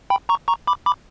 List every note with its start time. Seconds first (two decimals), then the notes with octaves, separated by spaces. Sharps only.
0.10 G5 B5
0.29 A#5 C#6
0.48 A#5 C#6
0.67 B5 D6
0.86 B5 D6